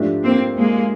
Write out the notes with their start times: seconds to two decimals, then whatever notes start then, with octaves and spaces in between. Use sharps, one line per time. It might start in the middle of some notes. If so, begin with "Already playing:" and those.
Already playing: G#2 F3 A3 D4 G4
0.24 A#3 C4
0.58 G#3 A#3